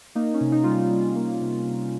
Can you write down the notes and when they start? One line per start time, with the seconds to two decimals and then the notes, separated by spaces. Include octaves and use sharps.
0.15 A#3 D#4
0.34 C#4
0.41 C3
0.52 D#4
0.63 G3 F4
0.72 D#4
0.90 G3
1.16 A#3
1.41 C3
1.66 C3